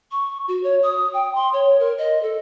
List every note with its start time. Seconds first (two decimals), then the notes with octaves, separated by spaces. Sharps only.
0.11 C#6
0.48 F#4
0.63 C#5
0.83 D#6
1.14 G5
1.35 C6
1.53 C#5
1.80 A#4
1.98 D#5
2.23 A4